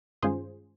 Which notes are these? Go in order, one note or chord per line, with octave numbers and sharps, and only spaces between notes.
G2 D#3 G#3 C#4 F4 G#4 C5